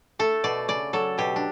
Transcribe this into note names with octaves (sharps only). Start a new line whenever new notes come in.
A3 A4
B2 D5
C#3 D5
F#3 A4
B2 G4
D4